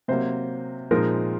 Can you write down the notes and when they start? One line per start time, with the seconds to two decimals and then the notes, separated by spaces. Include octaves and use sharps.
0.08 C3 F#3 A#3 C5
0.91 A#2 F3 G#3 C4 D#4 A#4